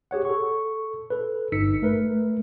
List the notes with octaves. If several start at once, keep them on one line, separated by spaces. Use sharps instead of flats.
G4 G#4 C#5 F#5
A4 C#6
A4 B4
G1 G2 D#4 E6 B6 C#7
A3 A#4 B4